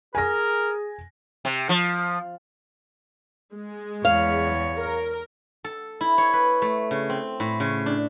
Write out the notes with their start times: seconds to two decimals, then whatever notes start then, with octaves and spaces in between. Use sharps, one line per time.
0.15 G#4 A#4 G#5 A#6
1.45 C3
1.69 F3
3.54 G#3
4.05 E2 C#5 F5
4.78 A#4
5.64 A4
6.01 E4
6.18 C#5
6.33 B4
6.62 A3
6.91 C#3
7.10 C4
7.40 A2
7.60 C#3
7.86 D4